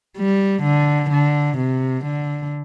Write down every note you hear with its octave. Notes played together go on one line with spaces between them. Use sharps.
G3
D3
D3
C3
D3